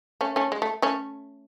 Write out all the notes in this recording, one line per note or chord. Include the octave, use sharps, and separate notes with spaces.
A3 C#4
A3 C#4
G#3
A3
A3 C#4